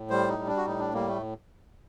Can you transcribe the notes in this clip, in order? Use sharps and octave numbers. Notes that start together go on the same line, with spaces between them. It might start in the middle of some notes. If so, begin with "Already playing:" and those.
Already playing: A2
G3 C5
D#4
G3
D4
F#4
A2 D#4
D4
G3 A#3
A3